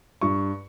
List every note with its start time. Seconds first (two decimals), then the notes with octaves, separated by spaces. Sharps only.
0.21 G2 C#6